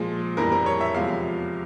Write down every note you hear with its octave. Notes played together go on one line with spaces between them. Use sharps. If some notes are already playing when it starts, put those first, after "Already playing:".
Already playing: A#2 F3 G#3
F2 E3 G3 A#4
A#4
C#5
E5
E2 C3 F3 G#3 F5